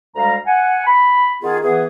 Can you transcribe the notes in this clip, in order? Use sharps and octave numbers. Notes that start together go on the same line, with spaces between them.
D2 G3 G#3 F5 A#5
F#5 G#5
B5
D#3 B3 F4 G#4
E3 B3 G#4